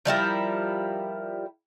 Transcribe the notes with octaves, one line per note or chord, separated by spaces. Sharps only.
F3 G3 E4 A#4